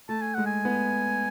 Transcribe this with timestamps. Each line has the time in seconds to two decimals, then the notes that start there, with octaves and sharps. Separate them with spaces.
0.09 A3 A5
0.21 G#5
0.34 G#3 F#5
0.46 G#5
0.65 B3